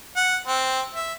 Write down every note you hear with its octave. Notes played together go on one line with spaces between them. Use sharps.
F#5
C4
E5